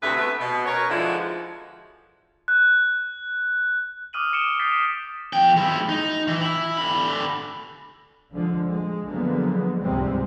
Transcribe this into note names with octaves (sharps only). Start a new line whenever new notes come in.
D2 C3 F#4 G#4 B4 E5
A3 B3 B4 E5
B2
C#4 A#4 B4 C#5
D3 F3 G#3 D#4 E4 F#4
F#6
D6 D#6 F6 D#7 F#7
D6 D#6 C#7 D7 E7 G7
D#6 G6 A6 B6 C7
F3 G5
G#3 E4
D#4
E3
E4
D3 B5
D3 F3 G#3
G#3
D3 F3 F#3 G#3 A#3 B3
C#2 G#2 C3 G3 G#3 C4